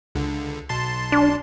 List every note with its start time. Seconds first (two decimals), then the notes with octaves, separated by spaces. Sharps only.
0.15 C#2 D3
0.69 B1 A5 C6
1.12 D4